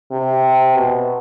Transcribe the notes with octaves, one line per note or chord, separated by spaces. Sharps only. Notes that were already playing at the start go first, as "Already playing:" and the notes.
C3
B2